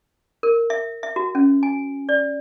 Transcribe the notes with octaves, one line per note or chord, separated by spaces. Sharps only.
A#4
E5
E5
F#4
C#4
G#5
D5